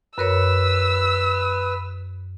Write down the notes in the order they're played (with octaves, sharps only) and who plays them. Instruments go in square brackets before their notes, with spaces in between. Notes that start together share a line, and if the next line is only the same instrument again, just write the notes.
[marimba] F#2 A#4 C#5 [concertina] B4 [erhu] E6